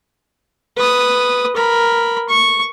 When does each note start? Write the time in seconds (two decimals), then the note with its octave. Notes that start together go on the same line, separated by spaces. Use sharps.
0.77 B4 D#6
1.55 A#4 B5
2.29 C#6